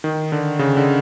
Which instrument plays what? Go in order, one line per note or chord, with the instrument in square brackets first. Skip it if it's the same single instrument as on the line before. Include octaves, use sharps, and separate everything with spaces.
[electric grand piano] D#3
D3
C#3
D3